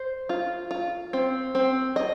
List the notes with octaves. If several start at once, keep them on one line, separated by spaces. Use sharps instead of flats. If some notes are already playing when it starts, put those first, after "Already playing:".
Already playing: C5
F4
F4
C4
C4
D#5